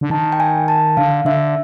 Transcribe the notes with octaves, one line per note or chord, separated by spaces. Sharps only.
D3
D#3 A5
G5
G#5
A5
D3 F5
D3 E5